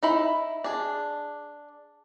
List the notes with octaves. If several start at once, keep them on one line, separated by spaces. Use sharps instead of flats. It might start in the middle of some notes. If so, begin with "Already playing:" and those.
D#4 E4 B5
D4 G#4